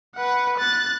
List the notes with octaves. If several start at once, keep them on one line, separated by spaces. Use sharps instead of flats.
B4 F#5
F#6 A6